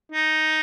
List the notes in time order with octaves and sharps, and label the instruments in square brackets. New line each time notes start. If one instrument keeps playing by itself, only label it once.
[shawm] D#4